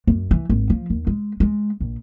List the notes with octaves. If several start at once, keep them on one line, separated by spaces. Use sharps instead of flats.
F#2
E3
G#1
F3
D#2
G#3
G#3
A#1